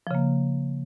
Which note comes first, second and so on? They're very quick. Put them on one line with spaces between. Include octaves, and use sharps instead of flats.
F3 C#3 A#3